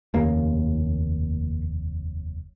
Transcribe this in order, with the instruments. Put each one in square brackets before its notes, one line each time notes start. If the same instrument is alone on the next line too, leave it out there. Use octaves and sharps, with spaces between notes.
[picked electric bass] F1 D#2 C#3 A#3